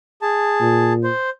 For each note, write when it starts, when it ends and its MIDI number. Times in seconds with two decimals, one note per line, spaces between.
0.22 0.93 68
0.22 0.93 81
0.61 1.09 46
1.04 1.30 72